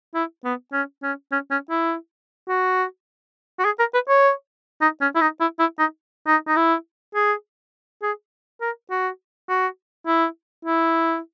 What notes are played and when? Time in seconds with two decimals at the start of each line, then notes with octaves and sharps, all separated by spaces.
0.15 E4
0.45 B3
0.73 C#4
1.03 C#4
1.32 C#4
1.51 C#4
1.70 E4
2.48 F#4
3.59 F#4
3.65 G#4
3.79 A#4
3.94 B4
4.09 C#5
4.82 D#4
5.01 C#4
5.16 E4
5.21 D#4
5.40 E4
5.59 E4
5.79 D#4
6.27 D#4
6.48 D#4
6.56 E4
7.15 G#4
8.02 G#4
8.61 A#4
8.90 F#4
9.49 F#4
10.07 E4
10.65 E4